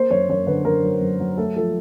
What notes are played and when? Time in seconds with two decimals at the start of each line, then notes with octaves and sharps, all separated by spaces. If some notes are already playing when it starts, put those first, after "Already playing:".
Already playing: A#3 C5
0.11 F#2 C#5
0.29 F#2 C#5
0.47 D3 B4
0.65 F#2 A#4
0.84 F#3
1.01 F#2
1.20 F#3
1.37 A3 A4
1.56 F3 A4